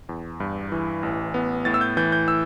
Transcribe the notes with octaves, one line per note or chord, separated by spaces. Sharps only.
E2
G2
E3
A1
B3
A2 A6
E6
G6
E3 G6
G6
E6